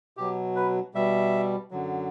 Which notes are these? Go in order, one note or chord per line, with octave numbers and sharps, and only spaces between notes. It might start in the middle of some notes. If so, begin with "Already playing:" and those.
B2 F#3 G4
B4
B2 G3 E5
F#2 D3 F#3